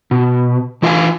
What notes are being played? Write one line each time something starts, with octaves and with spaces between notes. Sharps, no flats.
B2
E3 F4 D5 E5 F5 G#5